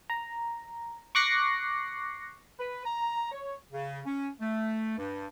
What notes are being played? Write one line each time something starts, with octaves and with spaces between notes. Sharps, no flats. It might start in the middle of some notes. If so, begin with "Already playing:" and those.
A#5
C#6 D6 F#6 A#6 C7 C#7
B4
A#5
C#5
C#3
C#4
A3
G2